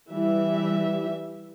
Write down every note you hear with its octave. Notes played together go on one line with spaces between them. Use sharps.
E3 G3 E5